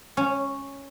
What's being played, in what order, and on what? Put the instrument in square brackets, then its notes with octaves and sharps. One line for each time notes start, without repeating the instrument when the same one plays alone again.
[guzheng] C#4